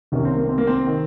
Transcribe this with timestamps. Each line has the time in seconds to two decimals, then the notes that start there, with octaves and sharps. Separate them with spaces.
0.12 C2 C3 D#3 C#4
0.25 C4
0.36 A#3
0.49 C4
0.58 A#3
0.67 C4
0.86 D#3